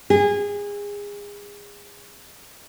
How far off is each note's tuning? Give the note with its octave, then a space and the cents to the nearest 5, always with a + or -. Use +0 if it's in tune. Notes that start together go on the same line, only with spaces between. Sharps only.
G#4 -25